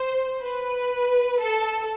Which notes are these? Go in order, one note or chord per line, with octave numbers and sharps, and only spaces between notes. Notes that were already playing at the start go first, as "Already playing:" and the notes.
Already playing: C5
B4
A4